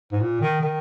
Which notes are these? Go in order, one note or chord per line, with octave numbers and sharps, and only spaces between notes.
G#2
A#2
D#3
D#3